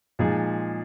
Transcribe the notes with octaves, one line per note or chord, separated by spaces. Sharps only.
A#2 F3 G#3 D#4 G#4